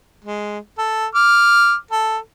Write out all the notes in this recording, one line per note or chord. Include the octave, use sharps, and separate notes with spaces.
G#3
A4
D6 F6
A4